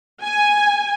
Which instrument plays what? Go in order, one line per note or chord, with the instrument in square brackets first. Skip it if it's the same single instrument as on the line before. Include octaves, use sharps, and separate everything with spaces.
[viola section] G#5